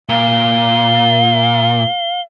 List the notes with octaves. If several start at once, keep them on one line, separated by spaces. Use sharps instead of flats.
A#2 F5 G7